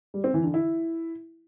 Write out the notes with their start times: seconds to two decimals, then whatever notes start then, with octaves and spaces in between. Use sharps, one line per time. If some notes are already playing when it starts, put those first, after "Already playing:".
0.14 G3
0.24 C4
0.34 E3
0.44 D3
0.54 E4